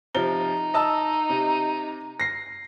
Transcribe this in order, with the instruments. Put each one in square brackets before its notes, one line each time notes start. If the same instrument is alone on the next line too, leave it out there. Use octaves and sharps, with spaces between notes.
[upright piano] C3 F3 G7 [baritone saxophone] D#4
[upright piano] D#5 A5 E6
C3
A#6 C7